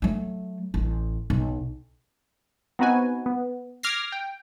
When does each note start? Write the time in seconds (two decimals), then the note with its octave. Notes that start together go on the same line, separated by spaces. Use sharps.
0.02 F#3 A3
0.74 A1
1.30 B1
2.79 B3 C4 D#4 F#4 B4 G#5
3.26 B3
3.83 D6 F6 G#6 A#6 C7
4.12 G5